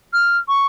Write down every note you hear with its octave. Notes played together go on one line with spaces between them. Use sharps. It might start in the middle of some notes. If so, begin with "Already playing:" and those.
F6
C#6